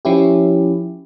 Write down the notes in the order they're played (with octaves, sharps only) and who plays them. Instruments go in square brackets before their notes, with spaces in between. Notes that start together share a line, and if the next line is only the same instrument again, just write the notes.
[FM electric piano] F3 C#4 E4 G4